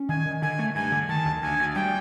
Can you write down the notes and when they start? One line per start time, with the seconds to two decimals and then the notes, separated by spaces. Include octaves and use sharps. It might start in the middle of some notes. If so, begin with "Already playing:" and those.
Already playing: C#4
0.09 D#3 G#5
0.25 D#3
0.42 D3 G#5
0.59 A3
0.75 G2 G#5
0.92 D3
1.09 D#3 A5
1.25 D2
1.42 D2 G#5
1.59 D2
1.75 G3 G5